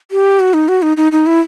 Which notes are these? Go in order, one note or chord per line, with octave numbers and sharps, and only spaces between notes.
G4
F#4
D#4
F#4
D#4
D#4
D#4
E4